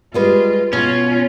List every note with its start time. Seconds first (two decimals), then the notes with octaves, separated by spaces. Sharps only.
0.14 G3 G#3 F4 B4
0.73 B2 C#4 F4